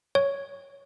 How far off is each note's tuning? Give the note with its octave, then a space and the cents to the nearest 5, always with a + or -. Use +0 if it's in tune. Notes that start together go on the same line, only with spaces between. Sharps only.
C#5 +5